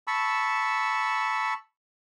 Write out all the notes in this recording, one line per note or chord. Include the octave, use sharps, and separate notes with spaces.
A5 B5 C#6 E6